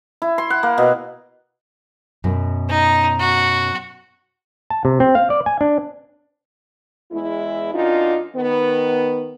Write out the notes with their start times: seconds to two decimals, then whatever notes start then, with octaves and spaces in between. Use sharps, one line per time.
0.22 E4
0.38 C6
0.50 F#5
0.63 A#3
0.78 B2
2.24 F#2 B2
2.69 D#4
3.20 F#4
4.70 A5
4.85 C3
5.00 C4
5.15 F5
5.30 D5
5.46 G#5
5.61 D4
7.12 E2 G#3 E4
7.74 F#2 D4 D#4 F4
8.35 D#3 B3